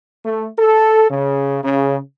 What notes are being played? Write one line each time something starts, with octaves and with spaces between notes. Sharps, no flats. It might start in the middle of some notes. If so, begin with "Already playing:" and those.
A3
A4
C#3
C#3